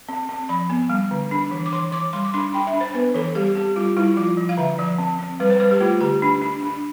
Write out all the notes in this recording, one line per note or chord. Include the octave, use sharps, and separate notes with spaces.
C4
C4
F3 B5
B3
G3
D3
D4
E3
D6
E3 C6
E3 D6
G3 C6
D6
D4 C6
D4 G5
E5
D4
C5
B3 B4
E3 A4
G3 G4
C4 G4
G3 F4
G3 E4
F3 F4
F3
F5
D3 E5
F3 D5
C4
C4
G3 B4
C5
G3 B4
G4
A3 F4
D3 G4
D4
D4
D4